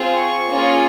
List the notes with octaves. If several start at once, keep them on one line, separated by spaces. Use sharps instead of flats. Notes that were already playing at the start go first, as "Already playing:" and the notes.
Already playing: C4 F4 G#4
C#6
A#3 C#4 F4 G#4